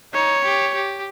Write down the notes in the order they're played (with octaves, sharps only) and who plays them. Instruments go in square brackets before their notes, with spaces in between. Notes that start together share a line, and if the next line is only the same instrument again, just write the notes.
[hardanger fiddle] D#4 [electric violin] C#5
[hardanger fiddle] G4
G4